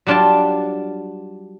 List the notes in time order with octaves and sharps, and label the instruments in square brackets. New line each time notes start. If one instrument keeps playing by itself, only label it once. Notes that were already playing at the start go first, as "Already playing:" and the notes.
[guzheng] F#3 G3 D4 F4 D5 A5